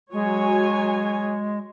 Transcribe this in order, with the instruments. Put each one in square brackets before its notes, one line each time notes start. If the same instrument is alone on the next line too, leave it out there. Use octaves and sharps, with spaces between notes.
[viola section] F#3 C#5 G#5 [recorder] G#3